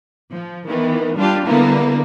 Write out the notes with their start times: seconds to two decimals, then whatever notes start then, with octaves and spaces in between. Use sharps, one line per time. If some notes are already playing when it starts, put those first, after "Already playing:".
0.30 F3
0.67 D#3 E3 B3
1.15 G3 D4 F4 G4
1.45 D3 G3 A#3 B3 E4